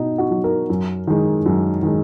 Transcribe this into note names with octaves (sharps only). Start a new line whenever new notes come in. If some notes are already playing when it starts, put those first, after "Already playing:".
Already playing: B2 D#4
F#4
F#3
A#4
F#2
D#3 G#3
F#2
D#3 G#3